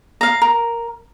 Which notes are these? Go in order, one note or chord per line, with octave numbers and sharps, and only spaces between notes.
F5 A#5
A#4